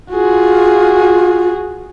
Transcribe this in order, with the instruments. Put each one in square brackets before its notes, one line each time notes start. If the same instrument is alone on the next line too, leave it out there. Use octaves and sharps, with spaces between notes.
[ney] F4 [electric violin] F#4 G#4